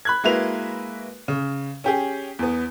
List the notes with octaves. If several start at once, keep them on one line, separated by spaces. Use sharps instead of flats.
B5 F#6 G#6
G#3 A#3 E4 F#4 B4 F7
C#3
C#4 G4 G#4
E2 B3